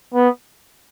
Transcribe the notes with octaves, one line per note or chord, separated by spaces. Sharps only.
B3